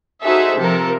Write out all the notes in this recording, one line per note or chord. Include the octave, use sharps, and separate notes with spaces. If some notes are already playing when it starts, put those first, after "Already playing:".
D#4 F#4 G#4 A4 C5 E5
C3 F3 A4 A#4